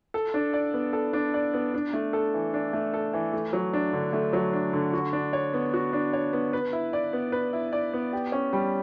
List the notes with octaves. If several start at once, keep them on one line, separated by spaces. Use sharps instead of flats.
A4
D4
D5
B3
A4
D4
D5
B3
D4
A3
A4
E3
D4
A3
A4
E3
A3
F#3
D4
D3
A3
F#3
D4
D3
F#4
D4
C#5
B3
F#4
D4
C#5
B3
B4
E4
D5
B3
B4
E4
D5
B3
G4
C#4
G3